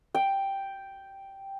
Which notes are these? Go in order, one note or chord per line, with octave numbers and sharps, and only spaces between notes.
G5